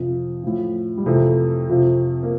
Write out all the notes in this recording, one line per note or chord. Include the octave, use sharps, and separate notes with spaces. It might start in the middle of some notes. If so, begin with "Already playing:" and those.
Already playing: F2 C3 F3
A2 F3
G3
F2 C3 E3 A3
F2 C3 F3
A#3